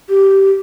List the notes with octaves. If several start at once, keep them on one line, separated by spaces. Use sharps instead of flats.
G4